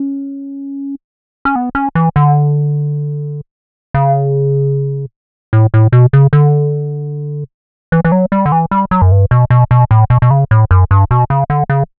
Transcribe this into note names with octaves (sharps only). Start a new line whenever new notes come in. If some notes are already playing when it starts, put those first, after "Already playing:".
Already playing: C#4
C#4
B3
C#4
E3
D3
C#3
A2
A2
B2
C#3
D3
E3
E3
F#3
G3
D3
E3
G3
F#3
F#2
G2
B2
B2
B2
A2
B2
B2
C#3
A2
F#2
G2
B2
C#3
D3
C#3